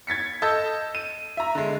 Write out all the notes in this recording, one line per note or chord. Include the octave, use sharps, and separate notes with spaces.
G#6 A6 B6 C#7
A4 D#5 A5 E6 G6
D#7
E5 A#5
D3 G#3